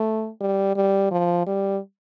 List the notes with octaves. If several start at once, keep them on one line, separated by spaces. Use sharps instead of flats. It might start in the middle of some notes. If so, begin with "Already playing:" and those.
Already playing: A3
G3
G3
F3
G3